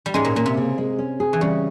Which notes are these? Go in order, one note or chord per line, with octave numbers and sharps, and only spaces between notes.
G3
G#2 G#3 C#4
A#2
A#2 A#3
C3
C#3
G#3
C#4
G#4
E3
C#3 G3